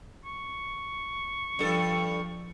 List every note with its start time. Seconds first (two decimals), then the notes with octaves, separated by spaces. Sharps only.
0.25 C#6
1.59 G2 F3 A4